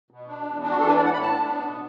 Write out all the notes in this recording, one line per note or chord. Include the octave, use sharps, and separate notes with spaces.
B2
D4
E2
D4
F#4
E3 A4
B4
A2 D5
F#5
A2 B5
A5
D4
B3
B2